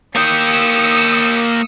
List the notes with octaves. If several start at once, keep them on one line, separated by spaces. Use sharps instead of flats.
A#3 G5 D#6 E6 C#7